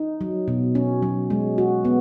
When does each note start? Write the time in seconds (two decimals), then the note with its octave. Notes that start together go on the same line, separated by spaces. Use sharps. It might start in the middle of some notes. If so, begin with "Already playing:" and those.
Already playing: D#4
0.21 F#3
0.48 B2
0.75 C#4
1.02 F#3
1.30 G#3
1.58 F#4
1.85 B3